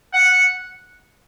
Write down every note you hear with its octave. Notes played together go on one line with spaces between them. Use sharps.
F#5